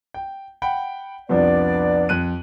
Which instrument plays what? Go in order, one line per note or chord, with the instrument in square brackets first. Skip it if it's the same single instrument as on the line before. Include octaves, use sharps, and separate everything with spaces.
[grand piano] G5
F#5 G5 B5
[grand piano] C2 F2 F3 [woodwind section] B3 D4 D5
[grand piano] F2 F#6 D#7